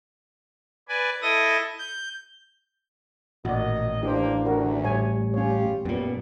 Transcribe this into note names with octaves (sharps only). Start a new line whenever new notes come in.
B4 D5 G#5
E4 A4 D#5 D#6 A#6
G6
A1 A#2 D#3 F#4 D5 D#5
G2 E3 A#3 D4 G4 C5
D2 F#4 A#4
A2 G3 C#5 G#5
C#4 F4 G4 C#5
F#2 A#2 G3 B3